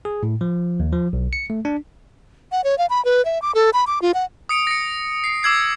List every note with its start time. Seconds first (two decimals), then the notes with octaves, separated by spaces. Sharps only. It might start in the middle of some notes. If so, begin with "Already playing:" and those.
0.05 G#4
0.23 A2
0.41 F3
0.80 D#2
0.93 F3
1.13 B1
1.33 C#7
1.50 A3
1.65 D4
2.52 F#5
2.64 C#5
2.78 F5
2.90 B5
3.05 B4
3.25 E5
3.42 D6
3.55 A4
3.73 B5
3.87 D6
4.02 F4
4.14 F#5
4.49 D#6 C#7 D7
4.67 A#6 C#7
5.24 C7
5.43 D6 E6 G#6 C7